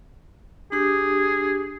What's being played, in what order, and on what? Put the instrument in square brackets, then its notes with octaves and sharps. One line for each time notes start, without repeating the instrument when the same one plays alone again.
[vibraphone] D4 G4 [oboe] G#4